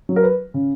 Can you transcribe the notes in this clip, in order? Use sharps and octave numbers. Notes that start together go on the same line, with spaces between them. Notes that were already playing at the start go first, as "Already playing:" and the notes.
F#3
A#4
B4
C#3